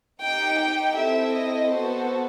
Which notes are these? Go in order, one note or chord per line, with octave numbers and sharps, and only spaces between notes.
D#4 G4 G5
G5
C4 E4 A4 E5
D#5
B3 F#4 A4 C5